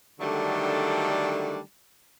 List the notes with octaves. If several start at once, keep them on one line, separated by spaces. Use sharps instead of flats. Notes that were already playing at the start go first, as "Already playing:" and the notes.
D3 D#3 F#3 G3 A3 D4